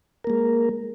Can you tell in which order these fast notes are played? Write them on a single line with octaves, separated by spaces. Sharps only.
A#4 A#3 G#3